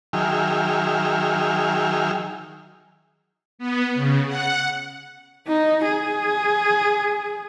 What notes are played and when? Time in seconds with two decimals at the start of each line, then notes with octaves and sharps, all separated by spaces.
0.13 D#3 F#3 G#4 E5 G5 F6
3.59 B3
3.95 C#3
4.27 F#5
5.47 D#4
5.85 G#4